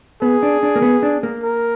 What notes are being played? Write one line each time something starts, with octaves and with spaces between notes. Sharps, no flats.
B3 G#4
D4
D4
A#3
B3
D4
A#3
A#4